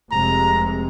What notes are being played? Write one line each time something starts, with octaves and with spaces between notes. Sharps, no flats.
F1 C3 G#3 A#5